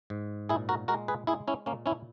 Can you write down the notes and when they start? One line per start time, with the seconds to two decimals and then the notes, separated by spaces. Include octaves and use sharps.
0.10 G#2
0.49 A#2 E4 G#4
0.69 F#4 A#4
0.88 G#3 F#4 A#4
1.08 G#4 B4
1.27 G#3 E4 G#4
1.48 C#4 E4
1.66 A#2 A#3 C#4
1.86 C#4 E4